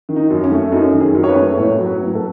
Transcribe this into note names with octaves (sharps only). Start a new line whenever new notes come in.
D#3
D#4
F#2
C#4
A3
F#2 D#4
D#3
G#4
F#2
C#5
B4
A3
A2 C#5
F#3
B4
A2
A4